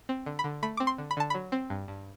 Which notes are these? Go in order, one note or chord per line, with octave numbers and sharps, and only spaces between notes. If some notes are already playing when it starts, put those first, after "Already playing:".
C4
D3
B5
D3
A3 B5
C4 D6
C6
D3
B5
D3 A5
F#3 B5
C4
G2
G2